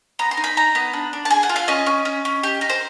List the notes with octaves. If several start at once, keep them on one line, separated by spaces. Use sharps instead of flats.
B3 A#5
C6
D#4
B5
D#4 A#5
B3
D4
D4
A5
G#4 G#5
F#5
F4
F5
C#4 D#5
C#4
C#4
C#4
G4
D#4
C5